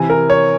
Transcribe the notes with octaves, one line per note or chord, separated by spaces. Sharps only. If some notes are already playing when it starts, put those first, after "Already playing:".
Already playing: C3 E3 G#5
A#4
C#5